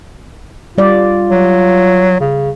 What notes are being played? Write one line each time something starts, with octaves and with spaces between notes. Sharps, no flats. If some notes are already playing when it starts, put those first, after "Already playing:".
G3 F4 D5
F#3
C#3